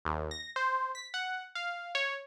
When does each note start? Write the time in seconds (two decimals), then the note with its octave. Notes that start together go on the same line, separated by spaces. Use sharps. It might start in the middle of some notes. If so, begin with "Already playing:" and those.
0.05 D#2
0.31 A#6
0.56 C5
0.95 B6
1.14 F#5
1.55 F5
1.95 C#5